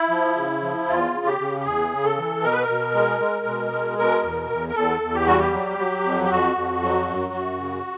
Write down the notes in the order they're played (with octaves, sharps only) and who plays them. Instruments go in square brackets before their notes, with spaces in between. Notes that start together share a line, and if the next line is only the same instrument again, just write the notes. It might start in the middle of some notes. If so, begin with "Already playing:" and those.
Already playing: [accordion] E4
F3
C#3
F3
E2 F4
C#3
G4
C#3
G4
E2 G#4
C#3
A4
E3
B2 A#4
B4
A#4
B2
G#3
G#3
B2
G#3
B2 A#4
E2
E2
A#4
E2 A4
E2
G4
G3 F#4
G4
F#3
F#3
F2
G4
F2 F#4
F2
F#3
F#2
F#2
C#3